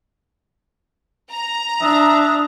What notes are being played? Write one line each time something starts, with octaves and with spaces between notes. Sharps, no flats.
A#5
D4 E5 D#6